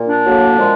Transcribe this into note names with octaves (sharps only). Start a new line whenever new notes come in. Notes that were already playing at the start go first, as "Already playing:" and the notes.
Already playing: A#2
D4
A2 F#3 A#3
A#2 F3 G#3